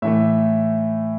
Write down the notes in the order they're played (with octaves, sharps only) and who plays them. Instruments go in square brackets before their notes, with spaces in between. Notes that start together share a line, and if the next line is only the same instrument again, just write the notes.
[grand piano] A2 E3 A3 E5